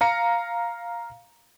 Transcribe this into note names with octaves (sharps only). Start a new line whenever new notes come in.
F5 A#5 C#7